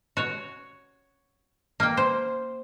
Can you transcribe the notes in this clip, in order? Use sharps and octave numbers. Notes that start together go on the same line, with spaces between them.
F#4 C#5
A#3 G5
C5